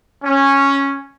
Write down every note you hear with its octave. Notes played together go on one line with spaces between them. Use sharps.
C#4